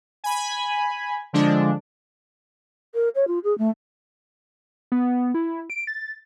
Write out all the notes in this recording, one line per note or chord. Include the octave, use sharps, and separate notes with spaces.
G#5 B5
D3 F3 G#3 D4
A#4
C#5
F4
G#4
A3
B3
E4
D7
A6